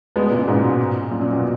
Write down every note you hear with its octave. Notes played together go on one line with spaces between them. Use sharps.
G#3 B3
A#2 C#3
G#2 B2
F#2 A#2
F#2 A#2
B2